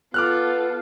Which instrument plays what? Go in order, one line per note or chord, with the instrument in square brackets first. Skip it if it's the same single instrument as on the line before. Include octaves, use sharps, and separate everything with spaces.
[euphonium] B3 [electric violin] F4 A4 [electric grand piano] D6 F6 F#6